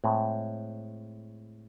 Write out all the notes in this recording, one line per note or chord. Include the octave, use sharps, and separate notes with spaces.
A2 G#3 C4